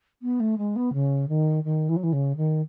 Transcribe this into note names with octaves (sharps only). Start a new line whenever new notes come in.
B3
A3
G#3
B3
C#3
D#3
D#3
E3
F#3
E3
C#3
D#3